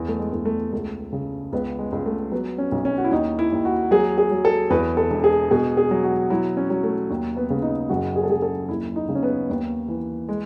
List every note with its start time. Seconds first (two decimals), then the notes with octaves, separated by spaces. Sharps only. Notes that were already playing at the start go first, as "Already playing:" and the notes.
Already playing: E2
0.08 A3
0.19 G#3
0.32 E2
0.45 A3
0.73 C#2 A3
1.13 C#3
1.52 C#2 B3
1.79 G#3
1.92 C#2
2.06 A3
2.31 F#3 B3
2.58 C#4
2.72 B1
2.85 C#4
2.98 F#4
3.04 E4
3.11 D#2 D#4
3.39 E4
3.52 D#2
3.65 F#4
3.91 F#3 G#4
4.18 G#4
4.31 F#3
4.45 A4
4.70 E2 B4
4.97 A4
5.10 E1
5.24 G#4
5.51 B2 G#4
5.77 G#4
5.91 F#3
6.04 F#4
6.30 F#3 E4
6.57 C#4
6.70 F#3
6.83 A3
7.10 D#2
7.37 B3
7.50 C#3
7.62 D#4
7.89 F#1 F#4
8.16 G#4
8.23 A4
8.29 F#1 G#4
8.42 A4
8.69 D#2 E4
8.96 D#4
9.09 C#3
9.15 C#4
9.23 B3
9.49 D#2
9.88 E3
10.29 G#3